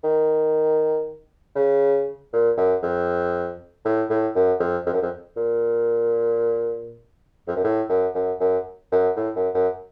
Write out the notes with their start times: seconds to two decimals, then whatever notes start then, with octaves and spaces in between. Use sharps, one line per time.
0.04 D#3
1.56 C#3
2.33 A#2
2.57 F#2
2.82 F2
3.85 A2
4.10 A2
4.35 F#2
4.60 F2
4.86 F2
4.93 F#2
5.02 F2
5.37 A#2
7.47 F2
7.56 F#2
7.64 A2
7.89 F#2
8.15 F#2
8.40 F#2
8.92 F#2
9.16 A2
9.36 F#2
9.54 F#2